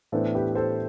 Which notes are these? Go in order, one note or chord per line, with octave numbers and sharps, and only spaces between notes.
A2 E3 B3 D4 A4 C5
G4 B4
A4 C5